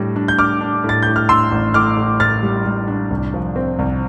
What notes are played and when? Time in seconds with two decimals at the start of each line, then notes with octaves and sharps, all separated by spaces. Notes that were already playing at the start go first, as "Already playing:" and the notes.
Already playing: A2 G3 D4
0.16 D4
0.28 G6
0.38 D4 D6 F6
0.61 D4
0.84 A2
0.89 A6
1.03 A2 G6
1.16 F6
1.29 D4 C6 E6
1.52 A1
1.74 A2 D6 F6
1.97 A2
2.20 A2 F6 A6
2.43 G3
2.66 G3
2.88 D4
3.11 C2
3.34 F3
3.56 C4
3.79 C2